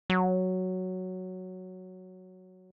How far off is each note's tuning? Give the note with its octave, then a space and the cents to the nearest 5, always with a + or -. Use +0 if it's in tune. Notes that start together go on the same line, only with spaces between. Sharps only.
F#3 +0